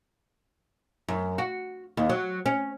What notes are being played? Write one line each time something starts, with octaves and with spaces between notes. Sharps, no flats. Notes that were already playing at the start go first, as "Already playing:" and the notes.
F#2
F#4
D#2
F#3
C#4